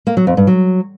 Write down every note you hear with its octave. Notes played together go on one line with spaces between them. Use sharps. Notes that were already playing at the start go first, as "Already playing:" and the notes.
A#3
F#3
F2
G2
F#3